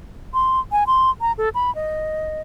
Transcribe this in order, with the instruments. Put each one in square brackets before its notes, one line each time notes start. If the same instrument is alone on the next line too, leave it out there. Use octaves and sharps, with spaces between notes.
[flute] C6
G#5
C6
A#5
A4
B5
D#5